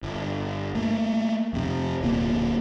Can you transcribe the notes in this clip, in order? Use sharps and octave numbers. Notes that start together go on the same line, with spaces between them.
G1
A3 A#3
F2 C3
D1 A#1 A#2 A#3